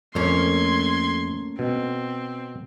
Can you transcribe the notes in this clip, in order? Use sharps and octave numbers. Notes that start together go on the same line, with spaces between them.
F2 A3 A#3 C#4 C6 G#6
B2 C4